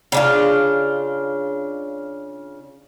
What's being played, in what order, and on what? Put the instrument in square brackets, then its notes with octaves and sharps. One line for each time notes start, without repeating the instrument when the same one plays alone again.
[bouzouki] C#3 D4 F4